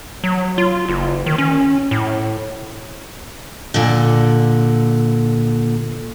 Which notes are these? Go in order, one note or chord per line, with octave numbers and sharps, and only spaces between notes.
F#3
F4
F#1
D#3
C#4
A2
A#2 D3